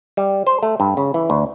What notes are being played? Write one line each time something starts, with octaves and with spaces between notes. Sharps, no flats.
G3
C5
A3
G2
C#3
E3
D2